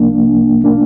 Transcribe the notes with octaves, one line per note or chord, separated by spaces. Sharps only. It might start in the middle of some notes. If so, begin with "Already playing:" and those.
Already playing: C2 C3 F3 A#3 D4
A#3 D4